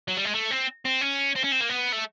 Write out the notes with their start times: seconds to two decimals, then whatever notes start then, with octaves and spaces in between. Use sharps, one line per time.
0.08 F#3
0.17 G3
0.25 G#3
0.35 A3
0.51 C4
0.85 C4
1.01 C#4
1.36 C4
1.44 C#4
1.52 C4
1.61 A#3
1.69 B3
1.93 A3